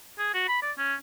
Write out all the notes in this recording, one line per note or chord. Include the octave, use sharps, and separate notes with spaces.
G#4
F#4
B5
D5
C#4